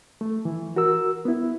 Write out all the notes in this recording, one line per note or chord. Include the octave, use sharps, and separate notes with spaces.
A3
E3
F#4 A#4 E6
B3 E4